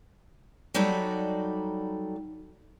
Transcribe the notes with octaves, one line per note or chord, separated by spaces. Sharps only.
F#3 G3 D#4 F#4 A4 D5